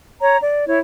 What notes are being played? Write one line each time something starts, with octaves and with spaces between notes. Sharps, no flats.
C#5 A#5
D5
E4 C#5